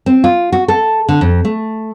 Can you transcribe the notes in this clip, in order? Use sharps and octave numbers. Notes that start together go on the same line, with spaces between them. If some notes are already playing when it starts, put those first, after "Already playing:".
C4
F4
F#4
A4
D3
F2
A3